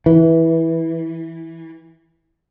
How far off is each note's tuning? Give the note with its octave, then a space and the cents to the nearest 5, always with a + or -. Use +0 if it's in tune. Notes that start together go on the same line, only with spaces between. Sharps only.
E3 -10